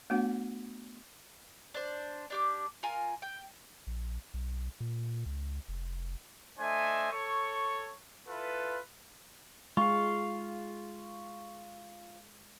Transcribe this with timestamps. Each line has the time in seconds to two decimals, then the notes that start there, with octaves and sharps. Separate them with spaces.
0.10 A3 B3 D4 F#4 C#5 F#5
1.74 D4 C5
2.30 D4 G4 D6
2.83 F4 A#4 G#5
3.22 G5
3.87 A#1
4.34 B1
4.80 A#2
5.26 C#2
5.68 F1
6.59 A3 D4 C5 D#5 E5 G#5
7.12 A4 C#5 C#6
8.28 E4 F4 A4 B4
9.77 G#3 F4 F5 C#6